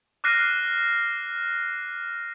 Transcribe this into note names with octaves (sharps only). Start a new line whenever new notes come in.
D6 F6 F#6 A#6 C7 D#7